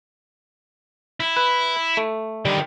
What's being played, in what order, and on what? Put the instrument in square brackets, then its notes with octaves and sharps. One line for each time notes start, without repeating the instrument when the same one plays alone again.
[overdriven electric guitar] E4
[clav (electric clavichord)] B4
A3
[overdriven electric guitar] D3 D#3 [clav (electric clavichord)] G3